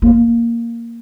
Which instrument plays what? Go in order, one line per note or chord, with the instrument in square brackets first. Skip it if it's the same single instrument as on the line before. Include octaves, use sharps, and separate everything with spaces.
[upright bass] A#3